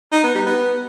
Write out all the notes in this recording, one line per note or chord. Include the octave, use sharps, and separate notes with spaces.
D#4
B3
G3
B3